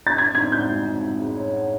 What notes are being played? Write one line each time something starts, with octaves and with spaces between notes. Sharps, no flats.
A6
C4 G#6
D#4 G#6
F#4 G6
G#3
C4
D#4
G#4
C#5
F#5